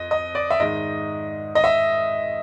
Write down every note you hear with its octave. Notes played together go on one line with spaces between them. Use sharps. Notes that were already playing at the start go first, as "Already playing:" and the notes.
Already playing: F2 D#5
D#5
D5
E5
G#2 D#3 D#5
D#5
E5